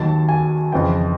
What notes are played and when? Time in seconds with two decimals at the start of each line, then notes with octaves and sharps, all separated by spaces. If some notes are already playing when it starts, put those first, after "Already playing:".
Already playing: D#2 D#3 F#3 A5
0.29 G#5
0.72 F2 C#3 E3 G5